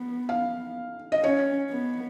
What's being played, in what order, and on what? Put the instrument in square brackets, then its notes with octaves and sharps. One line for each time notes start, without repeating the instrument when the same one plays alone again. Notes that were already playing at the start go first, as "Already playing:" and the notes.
Already playing: [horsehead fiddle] B3
[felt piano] F5
D#5
[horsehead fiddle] C#4 [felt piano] C#5
[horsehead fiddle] B3